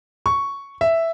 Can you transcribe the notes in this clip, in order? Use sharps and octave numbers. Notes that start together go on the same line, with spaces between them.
C#6
E5